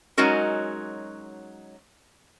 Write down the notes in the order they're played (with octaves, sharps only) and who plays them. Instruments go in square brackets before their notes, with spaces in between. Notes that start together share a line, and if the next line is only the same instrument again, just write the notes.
[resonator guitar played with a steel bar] F#3 G#3 C#4 D#4 F#4 A#4